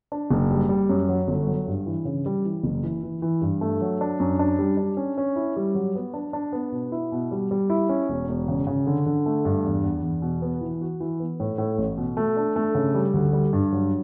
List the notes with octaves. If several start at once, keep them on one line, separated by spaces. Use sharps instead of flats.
D4
F#1
G3
G3
F#2
F#3
G1
F#3
G2
E3
C#3
G3
E3
F#1
E3
E3
E3
G2
A3
F#3
D4
F#2
D4
G3
D4
C#4
C#4
E4
G3
F#3
B3
D4
D4
B3
B2
E4
B2
G3
G3
E4
C#4
E1
E1
C#3
C#3
D3
D3
A3
G2
E2
E2
E2
B2
B3
E3
F#4
E3
B3
A2
A2
A1
B2
A3
D4
A3
C#3
G3
D2
G3
G2
F#3